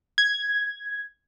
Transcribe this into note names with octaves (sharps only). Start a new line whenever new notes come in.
G#6